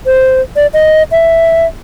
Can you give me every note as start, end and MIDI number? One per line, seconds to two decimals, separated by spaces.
0.06 0.41 72
0.56 0.67 74
0.74 1.03 75
1.11 1.66 76